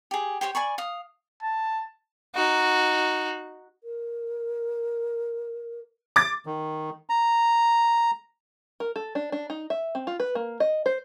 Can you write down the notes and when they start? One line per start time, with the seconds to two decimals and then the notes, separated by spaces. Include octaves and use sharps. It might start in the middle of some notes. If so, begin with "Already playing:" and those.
0.11 G4 G#4
0.41 G4 C5 C#5 G5
0.55 D5 G#5 B5 C#6
0.78 F5 D#6
1.43 A5
2.35 D#4 F#4
3.84 A#4
6.16 D6 A6
6.46 D#3
7.10 A#5
8.80 A#4
8.96 A4
9.15 D4
9.32 D4
9.50 D#4
9.70 E5
9.95 C4
10.07 F4
10.20 B4
10.35 A#3
10.60 D#5
10.86 C5